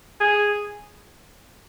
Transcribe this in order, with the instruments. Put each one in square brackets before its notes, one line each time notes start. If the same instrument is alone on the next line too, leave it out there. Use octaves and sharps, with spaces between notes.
[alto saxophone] G#4